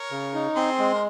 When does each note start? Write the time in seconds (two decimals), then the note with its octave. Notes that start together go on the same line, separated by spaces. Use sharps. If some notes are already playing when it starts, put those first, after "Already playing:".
Already playing: A#4 C#5
0.11 C#3
0.34 D#4
0.56 C4 G#4 C5
0.79 G#3
0.94 A#4